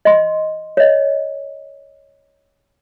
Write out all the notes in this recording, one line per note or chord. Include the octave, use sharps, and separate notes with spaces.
D#5 C6
C#5 D#5